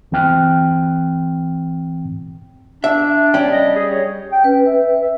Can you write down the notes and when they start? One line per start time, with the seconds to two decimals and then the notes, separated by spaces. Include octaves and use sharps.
0.11 D2 E3 C4 G5 F6 F#6
2.84 D4 E5
3.34 G3 C#4 G5
3.52 D#5
3.76 G#4
3.91 C#5
4.32 G5
4.44 C#4 B4
4.66 E5
5.02 E5